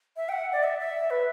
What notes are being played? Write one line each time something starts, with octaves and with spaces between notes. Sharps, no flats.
E5
G5
F#5
D5
E5
E5
B4